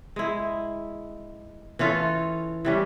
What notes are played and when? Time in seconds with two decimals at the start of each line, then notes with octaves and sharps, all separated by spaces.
0.16 G#3 E4
1.79 E3 C#4 F4 A4
2.65 E3 G3 C#4